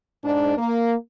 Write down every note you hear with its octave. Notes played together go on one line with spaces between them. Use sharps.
G#2 D4
A#3